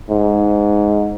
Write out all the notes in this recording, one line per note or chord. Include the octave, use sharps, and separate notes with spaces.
G#2